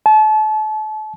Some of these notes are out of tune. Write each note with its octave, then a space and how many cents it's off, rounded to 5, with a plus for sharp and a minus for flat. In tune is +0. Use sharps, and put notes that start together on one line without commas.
A5 -35